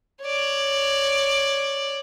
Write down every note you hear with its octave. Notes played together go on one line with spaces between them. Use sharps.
C#5 D5